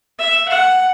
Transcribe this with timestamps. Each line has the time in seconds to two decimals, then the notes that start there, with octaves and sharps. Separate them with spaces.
0.19 E5
0.49 F#5